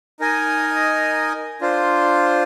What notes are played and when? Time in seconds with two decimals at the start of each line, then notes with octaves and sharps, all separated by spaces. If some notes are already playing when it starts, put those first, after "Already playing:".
0.20 D#4 A#4 D#5 G#5
1.61 D4 F4 C5